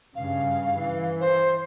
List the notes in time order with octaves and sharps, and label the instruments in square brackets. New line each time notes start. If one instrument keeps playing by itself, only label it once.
[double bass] G2 C#3 [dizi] F5
[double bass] E3
[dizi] C5